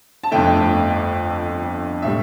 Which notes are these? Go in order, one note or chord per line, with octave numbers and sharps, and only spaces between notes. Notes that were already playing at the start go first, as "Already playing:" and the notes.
A5
G1 F2 D3 A3 G5
A2 G3 E5